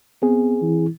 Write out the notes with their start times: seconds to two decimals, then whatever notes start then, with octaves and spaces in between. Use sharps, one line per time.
0.22 B3 C4 G#4
0.62 E3